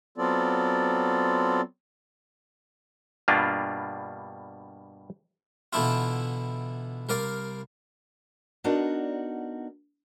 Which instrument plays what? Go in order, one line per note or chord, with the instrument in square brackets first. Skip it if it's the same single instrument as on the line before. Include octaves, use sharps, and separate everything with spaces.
[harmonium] F#3 B3 C4 F4 A4 D5
[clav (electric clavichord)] G2 B2 G3 A#3 D4 F4
[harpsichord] B2 D3 E3 D4 E4 F4
C2 A#4 D5 F5
[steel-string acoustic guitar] B3 D4 D#4 F#4 A#4 D5